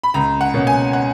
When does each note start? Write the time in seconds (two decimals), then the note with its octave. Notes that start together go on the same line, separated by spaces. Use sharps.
0.04 B5
0.14 C#2 A#5
0.41 F#5
0.54 B2 A#3 C#4
0.67 G#5
0.93 F#5